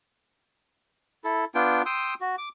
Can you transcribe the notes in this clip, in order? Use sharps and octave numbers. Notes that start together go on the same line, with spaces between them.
E4 A4
B3 D4 F4 G5
G5 C6 D#6 E6
F#4
D6